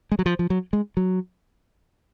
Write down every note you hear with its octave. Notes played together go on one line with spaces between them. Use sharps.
G#3
F#3
F3
F3
F#3
G#3
F#3